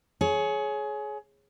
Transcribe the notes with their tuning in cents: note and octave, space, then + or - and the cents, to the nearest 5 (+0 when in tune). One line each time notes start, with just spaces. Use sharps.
G#4 +25 C#5 +0